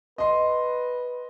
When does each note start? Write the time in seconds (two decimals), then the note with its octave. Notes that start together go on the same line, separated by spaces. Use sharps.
0.18 B4 D#5 C6